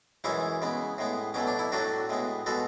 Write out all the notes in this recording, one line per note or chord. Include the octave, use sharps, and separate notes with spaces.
F#2 E3 G#3 C#4 E4
C#3 G#3 B3
A2 G#3 B3
B2 F#3 A3 C#4
D4
E4
A2 F#3 A3 D4 F#4
A2 G#3 B3
B2 G#3 B3 F#4 A4